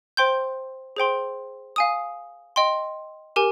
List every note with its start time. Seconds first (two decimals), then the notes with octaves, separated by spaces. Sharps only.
0.17 C5 G5 C6 G6
0.96 G#4 C5 G5 C6
1.76 F5 G#5 D#6
2.56 D#5 G5 C6
3.36 G4 A#4 G#5